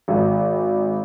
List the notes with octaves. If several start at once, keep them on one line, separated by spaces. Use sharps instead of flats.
G#1